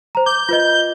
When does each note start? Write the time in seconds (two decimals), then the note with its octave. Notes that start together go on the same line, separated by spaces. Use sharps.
0.15 C5 A#5
0.26 D6 G6
0.49 F4 B4 D#5